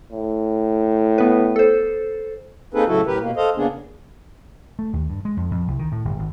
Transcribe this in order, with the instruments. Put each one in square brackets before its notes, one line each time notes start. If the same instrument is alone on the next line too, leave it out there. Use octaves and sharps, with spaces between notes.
[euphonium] A2
[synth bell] B3 B4
A4 C5
[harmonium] A#3 C4 D#4 G#4 A4 B4
A2 C#3 F#3 E4 F#4 A4
A2 G4 A#4 B4
B2 A#3
A4 C5 D#5 F5
C#3 A#3 B3 D4 G#4
[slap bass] A3
D#2
G2
G#3
F2
F2
C2
D#3
A2
G1
G#1